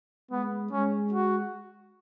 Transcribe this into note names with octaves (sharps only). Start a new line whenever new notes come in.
G#3 B3
G#3 C#4
F#4